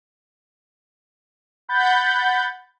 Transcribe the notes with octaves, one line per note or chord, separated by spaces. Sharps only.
F#5 B5 G6 A6